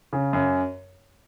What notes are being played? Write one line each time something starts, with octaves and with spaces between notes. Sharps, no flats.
C#3
F#2